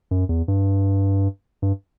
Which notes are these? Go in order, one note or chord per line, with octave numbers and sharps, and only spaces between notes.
F#2
E2
G2
G2